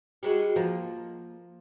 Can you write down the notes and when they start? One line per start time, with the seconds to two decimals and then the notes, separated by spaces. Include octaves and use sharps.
0.23 G3 G#3 F#4
0.56 F3 A#3